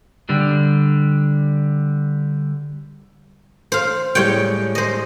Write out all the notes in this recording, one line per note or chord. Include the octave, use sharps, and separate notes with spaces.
D3 G3
C5 F5
A2 G3 G#3 C#5 G5
C5 D#5